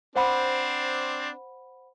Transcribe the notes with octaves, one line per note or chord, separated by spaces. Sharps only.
C4 D4 C5 F#5 B5